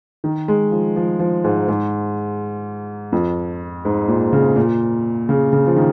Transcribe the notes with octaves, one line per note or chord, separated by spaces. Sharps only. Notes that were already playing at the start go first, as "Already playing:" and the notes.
D#3
G#3
F3
F3
F3
G#2
G#2
F2
G#2
A#2
C#3
A#2
C#3
C#3
F3
D#3